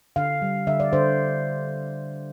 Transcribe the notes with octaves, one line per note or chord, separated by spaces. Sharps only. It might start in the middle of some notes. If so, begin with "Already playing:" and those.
D3 F5
G3
D3 E5
D5
D3 C5